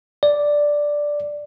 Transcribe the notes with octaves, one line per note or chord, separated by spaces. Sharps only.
D5